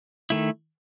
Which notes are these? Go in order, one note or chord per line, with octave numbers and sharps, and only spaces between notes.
D#3 A3 E4